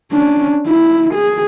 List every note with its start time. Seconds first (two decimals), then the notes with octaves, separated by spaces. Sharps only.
0.12 C#4 D4
0.68 E4
1.14 G#4